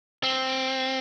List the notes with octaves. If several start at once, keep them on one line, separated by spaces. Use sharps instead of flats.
C4